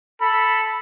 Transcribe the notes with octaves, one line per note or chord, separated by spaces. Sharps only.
A4 B5